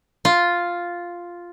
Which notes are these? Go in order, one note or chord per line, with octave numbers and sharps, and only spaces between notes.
F4